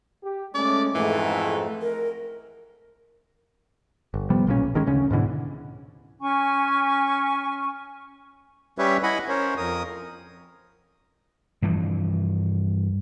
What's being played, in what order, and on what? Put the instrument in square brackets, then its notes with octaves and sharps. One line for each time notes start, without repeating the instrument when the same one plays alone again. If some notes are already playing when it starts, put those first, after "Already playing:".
[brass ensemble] G4
[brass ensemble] G#3 A3 C#4 [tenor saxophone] D5
[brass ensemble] F2 G#2 A3 [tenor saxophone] E3
[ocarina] A#4
[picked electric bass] G1
C3 F3 G3 B3
B1 A#2 F3 C#4
G1 D#3 G#3 C#4
D2 C#3 C#4
G#2 B2 D3 E3
[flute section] C#4 G#5 C#6
[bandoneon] G3 C#4 G4 B4 C#5 E5
E4 D#5 F#5 G#5 B5
C#4 A#4 C5 C#5
F2 A#4 D#6
[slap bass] G2 E3 F3